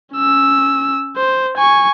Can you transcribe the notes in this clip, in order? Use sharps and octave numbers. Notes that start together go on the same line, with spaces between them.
C#4 E6
C5
G#5 C#6